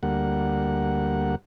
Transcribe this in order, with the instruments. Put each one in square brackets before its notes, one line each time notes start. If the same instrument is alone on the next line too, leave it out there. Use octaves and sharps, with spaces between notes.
[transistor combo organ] D2 G3 A#3 F#5